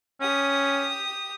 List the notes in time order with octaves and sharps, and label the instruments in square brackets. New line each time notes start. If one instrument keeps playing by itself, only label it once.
[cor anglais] C#4 [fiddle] G4 D#6